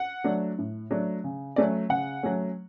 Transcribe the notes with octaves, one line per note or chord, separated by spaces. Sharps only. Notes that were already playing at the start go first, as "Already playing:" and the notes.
Already playing: F#5
F#3 A3 D4
A2
F#3 A3 D4
C#3
F#3 A3 C#4 D5
C#3 F#5
F#3 A3 C#4